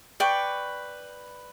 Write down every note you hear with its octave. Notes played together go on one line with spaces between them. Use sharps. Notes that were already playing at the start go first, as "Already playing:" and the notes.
B4 D5 G5 C#6